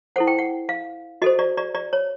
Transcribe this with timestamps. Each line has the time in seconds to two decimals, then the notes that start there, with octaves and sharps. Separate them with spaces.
0.16 E4 A4 C5 F#5
0.27 G5
0.39 F#5
0.69 F5
1.22 F#4 A4 C5 D#5
1.39 D5
1.57 D5
1.75 D5
1.93 C#5